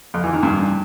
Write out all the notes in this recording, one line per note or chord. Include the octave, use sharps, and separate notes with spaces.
F2
E3
D#3
G2